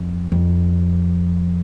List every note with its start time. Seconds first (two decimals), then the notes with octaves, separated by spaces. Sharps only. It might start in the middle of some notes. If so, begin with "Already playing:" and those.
Already playing: F2
0.32 F2